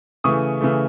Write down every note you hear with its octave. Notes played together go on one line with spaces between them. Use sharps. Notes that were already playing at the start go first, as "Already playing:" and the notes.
C#3 E3 A3 C#6 D#6
C#3 E3 A3